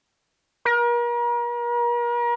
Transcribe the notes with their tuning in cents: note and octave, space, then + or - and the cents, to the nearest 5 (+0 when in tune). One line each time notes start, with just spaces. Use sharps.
A#4 +40